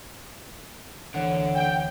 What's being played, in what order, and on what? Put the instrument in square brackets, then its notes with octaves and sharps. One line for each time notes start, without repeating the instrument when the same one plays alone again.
[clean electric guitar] D2 E3 C#5 [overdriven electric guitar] D3 [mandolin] F#5
[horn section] G5